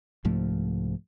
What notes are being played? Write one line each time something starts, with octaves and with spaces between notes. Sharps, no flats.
C2 G#2 F3 A3